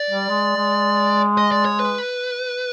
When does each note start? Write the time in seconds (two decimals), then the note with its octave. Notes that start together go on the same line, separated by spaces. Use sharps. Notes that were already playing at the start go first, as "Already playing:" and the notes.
Already playing: D5
0.11 G3
0.29 G#3
0.57 G#3
1.38 D#5
1.52 D5
1.65 C#5
1.79 B4